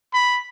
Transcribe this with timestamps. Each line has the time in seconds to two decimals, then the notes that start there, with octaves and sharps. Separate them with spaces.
0.14 B5